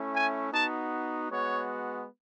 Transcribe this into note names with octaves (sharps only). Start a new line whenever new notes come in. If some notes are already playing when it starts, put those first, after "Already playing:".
Already playing: A3 C#4 E4
G#5
B3 D#4 F#4 A5
G#3 B3 F#4 C#5